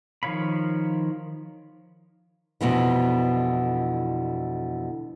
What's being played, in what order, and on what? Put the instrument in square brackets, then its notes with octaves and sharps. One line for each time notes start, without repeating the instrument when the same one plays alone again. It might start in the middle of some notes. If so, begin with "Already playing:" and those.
[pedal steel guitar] D#3 F3 C#5 F5 B5
[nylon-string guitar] F2 B2 D3 E3